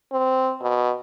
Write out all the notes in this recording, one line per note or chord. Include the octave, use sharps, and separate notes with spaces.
C4
B2